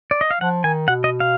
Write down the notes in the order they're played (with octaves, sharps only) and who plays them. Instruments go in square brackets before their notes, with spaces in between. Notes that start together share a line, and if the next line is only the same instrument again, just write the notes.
[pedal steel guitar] D5
D#5
F5
[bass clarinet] F3 [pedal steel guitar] F#5
[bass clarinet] D#3 [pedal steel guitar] G#5
[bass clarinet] B2 [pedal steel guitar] F#5
[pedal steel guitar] D#5
F5